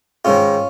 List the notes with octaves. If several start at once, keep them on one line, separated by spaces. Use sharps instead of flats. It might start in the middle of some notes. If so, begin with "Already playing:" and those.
G#2 D#3 C#4 F4